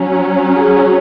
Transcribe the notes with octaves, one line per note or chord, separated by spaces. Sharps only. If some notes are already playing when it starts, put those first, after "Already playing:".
Already playing: F#3 C#4
G#4